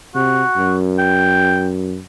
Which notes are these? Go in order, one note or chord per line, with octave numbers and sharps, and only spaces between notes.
C3 F#4
F#2
G5